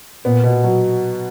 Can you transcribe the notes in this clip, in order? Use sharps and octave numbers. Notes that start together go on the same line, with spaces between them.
A#2 B3
B2
F#3